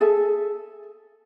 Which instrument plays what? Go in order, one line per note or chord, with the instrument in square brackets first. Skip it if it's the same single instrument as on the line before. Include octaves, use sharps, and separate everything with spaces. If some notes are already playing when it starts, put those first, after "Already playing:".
[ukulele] G#4 A4 E5 G#5